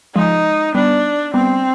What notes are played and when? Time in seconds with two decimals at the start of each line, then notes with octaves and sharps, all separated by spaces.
0.15 F3 G#3 D#4
0.75 G3 B3 D4
1.34 G3 B3 C4